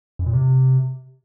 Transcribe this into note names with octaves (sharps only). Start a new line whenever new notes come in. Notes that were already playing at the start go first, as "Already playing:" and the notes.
F#2
A#2
C3